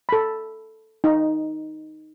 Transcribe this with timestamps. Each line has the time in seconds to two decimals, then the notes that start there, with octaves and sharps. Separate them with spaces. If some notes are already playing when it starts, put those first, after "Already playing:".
0.09 A4 B5
1.04 D#4